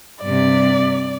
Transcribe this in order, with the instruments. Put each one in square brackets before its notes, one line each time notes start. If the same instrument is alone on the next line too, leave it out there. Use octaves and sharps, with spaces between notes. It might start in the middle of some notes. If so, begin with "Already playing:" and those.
[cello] G2 C3 [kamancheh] D5